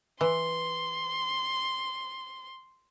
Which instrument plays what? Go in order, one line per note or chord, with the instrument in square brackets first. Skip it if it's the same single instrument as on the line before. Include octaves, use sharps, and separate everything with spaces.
[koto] E3 [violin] C6